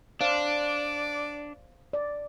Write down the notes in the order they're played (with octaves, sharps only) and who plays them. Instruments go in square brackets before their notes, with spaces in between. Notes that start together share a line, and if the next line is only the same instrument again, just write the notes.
[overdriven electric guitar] D4 [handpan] C5 F5 [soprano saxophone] D5
[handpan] D5